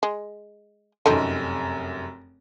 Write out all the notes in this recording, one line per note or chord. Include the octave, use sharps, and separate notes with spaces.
G#3
F1 F#2 A3 C4 D#4